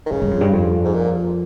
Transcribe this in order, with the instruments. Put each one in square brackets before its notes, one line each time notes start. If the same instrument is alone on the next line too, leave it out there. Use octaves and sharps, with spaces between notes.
[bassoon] D#3
[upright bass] G#2 [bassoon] C#3
[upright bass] G2
F2
G2
F2
[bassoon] G#2
A#2